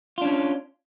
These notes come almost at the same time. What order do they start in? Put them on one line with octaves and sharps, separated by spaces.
F4 D4 C#4